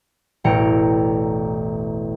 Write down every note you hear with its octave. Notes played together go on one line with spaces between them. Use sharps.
E1 A1 G5 A#5 C#7 D7